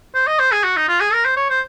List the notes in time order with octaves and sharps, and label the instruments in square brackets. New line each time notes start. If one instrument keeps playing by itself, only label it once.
[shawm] C5
D#5
C5
G#4
F#4
D#4
F4
G#4
A#4
C5
C#5
C5